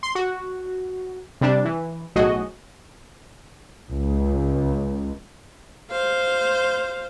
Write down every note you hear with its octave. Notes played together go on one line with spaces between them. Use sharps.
C6
F#4
C3 G3 D4
E3
B1 A2 F#4 G#4 D#5
C#2
C5 F5